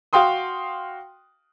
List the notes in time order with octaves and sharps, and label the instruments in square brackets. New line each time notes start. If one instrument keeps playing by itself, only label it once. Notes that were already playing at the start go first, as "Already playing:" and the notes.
[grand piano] F#4 F5 G5 C6 D#6